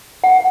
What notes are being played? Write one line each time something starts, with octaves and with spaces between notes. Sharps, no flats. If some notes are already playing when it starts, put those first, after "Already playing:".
F#5